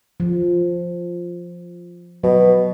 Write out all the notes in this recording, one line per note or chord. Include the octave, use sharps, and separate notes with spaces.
F3
B2 F#3